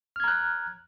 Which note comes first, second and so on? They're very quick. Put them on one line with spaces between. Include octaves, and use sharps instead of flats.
F6 G#6 A#5 F#6